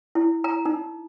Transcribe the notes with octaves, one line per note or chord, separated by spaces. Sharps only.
E4
A#5
D#4